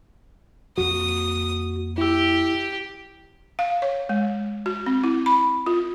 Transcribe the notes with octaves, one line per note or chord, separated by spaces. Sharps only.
F2 A#3 F#4 D#6
E4 G4 E6
F5
C#5
G#3
F#4
C4
E4
B5
F4